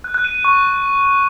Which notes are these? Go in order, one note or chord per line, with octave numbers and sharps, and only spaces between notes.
F#6
F#6
D#7
D#7
C#6